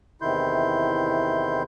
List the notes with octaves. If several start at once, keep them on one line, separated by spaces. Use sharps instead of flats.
E2 C3 D#3 E4 C6 G6